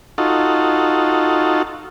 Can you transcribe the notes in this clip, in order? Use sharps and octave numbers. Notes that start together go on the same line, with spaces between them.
D#4 F4 F#4 A4